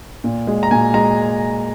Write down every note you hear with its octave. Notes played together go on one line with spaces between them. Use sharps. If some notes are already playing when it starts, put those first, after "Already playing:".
A#2
G#3
A#5
A#2 G#5
G#3 A#5